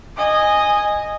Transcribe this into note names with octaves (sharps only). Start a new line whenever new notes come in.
D#5 G#5